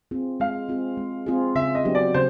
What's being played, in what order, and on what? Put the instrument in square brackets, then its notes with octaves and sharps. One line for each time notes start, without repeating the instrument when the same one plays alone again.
[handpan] C4 F4 G#4
[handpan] G#3 [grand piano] F5
[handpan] C4 F4 G#4
G#3
C4 F4 G#4
[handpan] C#3 [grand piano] E5
[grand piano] D#5
[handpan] F#3 B3 D4 G4
[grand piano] D5
[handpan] C#3 [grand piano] C5